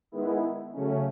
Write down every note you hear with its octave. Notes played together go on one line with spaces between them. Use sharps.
D#3 G#3 B3 E4
C#3 F#3 A3 C#4